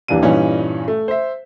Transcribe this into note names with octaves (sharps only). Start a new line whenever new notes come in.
D#1 E3 D4 F5 D#7
G2 A#2 E3 G3 C#4 D#4
A3
C5 E5